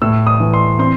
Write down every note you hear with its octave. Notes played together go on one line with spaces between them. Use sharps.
A2 E6
D#6
E3
C6
C4 C6